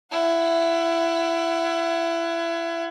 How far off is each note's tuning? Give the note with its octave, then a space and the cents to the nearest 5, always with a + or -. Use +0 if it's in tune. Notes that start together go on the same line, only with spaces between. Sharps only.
E4 +25 F#5 +0